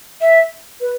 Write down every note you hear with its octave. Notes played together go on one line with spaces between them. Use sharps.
E5
B4